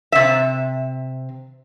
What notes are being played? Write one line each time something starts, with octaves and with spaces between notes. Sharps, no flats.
C3 E5